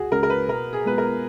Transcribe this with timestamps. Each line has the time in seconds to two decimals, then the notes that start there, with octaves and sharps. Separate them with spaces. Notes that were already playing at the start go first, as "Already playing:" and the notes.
Already playing: C#2 F#4 G#4
0.12 C#3 G#3 C#4 A#4
0.23 A#4
0.30 B4
0.48 B2 A#4
0.73 G#4
0.85 G#3 B3 F4 B4
0.98 A#4